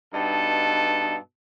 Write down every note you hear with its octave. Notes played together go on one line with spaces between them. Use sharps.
G2 B2 D#4 A4